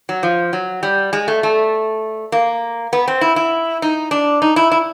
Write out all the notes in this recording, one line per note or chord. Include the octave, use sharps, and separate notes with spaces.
F#3
F3
F#3
G3
G#3
A3
A3
A#3
B3
C4
E4
E4
D#4
D4
D#4
E4
E4